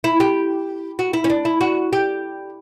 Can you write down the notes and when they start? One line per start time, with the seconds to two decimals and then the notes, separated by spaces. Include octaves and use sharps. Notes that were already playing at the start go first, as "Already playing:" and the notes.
0.04 E4
0.20 G4
0.99 F#4
1.13 E4
1.24 C#4
1.30 D4
1.45 E4
1.61 F#4
1.93 G4